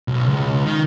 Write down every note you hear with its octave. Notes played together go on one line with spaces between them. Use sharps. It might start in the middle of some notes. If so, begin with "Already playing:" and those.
B1
C#2
D#3